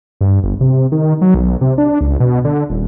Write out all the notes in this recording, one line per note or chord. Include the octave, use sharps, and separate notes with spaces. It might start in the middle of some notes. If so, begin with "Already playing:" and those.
G2
G1
C3
D#3
F#3
B1
C3
D4
C#2
B2
D3
D#1